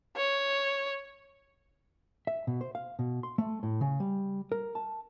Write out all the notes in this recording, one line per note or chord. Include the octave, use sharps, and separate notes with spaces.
C#5
E5
B2
C5
F5
B2
C6
A3
A2
C#3
G3
A#4
A5